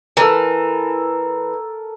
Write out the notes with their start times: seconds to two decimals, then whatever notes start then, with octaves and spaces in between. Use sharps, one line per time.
0.17 E3 A4 A#4